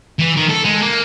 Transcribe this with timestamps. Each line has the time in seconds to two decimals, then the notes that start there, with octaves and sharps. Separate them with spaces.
0.19 E3
0.37 D#3
0.49 A4
0.65 G#3
0.82 A#3